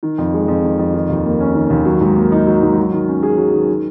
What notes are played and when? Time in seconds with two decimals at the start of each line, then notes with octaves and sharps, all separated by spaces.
0.03 D#3
0.18 F2
0.34 G#3
0.48 F2
0.64 D#3
0.79 F2
0.94 D#3
1.09 D#2
1.25 A#3
1.40 C#4
1.55 D#3
1.70 D#2
1.85 F#3
2.00 G#2
2.17 A#3
2.32 D#4
2.47 F#3
2.62 G#2
2.78 F#3
2.93 D#3
3.08 C#4
3.23 G#4
3.37 F#3
3.53 D#3
3.69 D#3